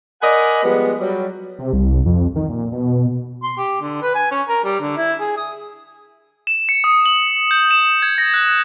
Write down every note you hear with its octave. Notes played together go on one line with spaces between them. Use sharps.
A#4 D5 D#5 F#5 G#5 B5
F3 G3 G#3 B3
F#3 G3
C3
C2
F2
D#3
A#2
B2
C6
G4
D3
B4
G#5
C#4
A#4
G3
D3
E4
G#4
D#6
E7
C#7
D#6
F#7
G6
E7
G#6
A#6
F#6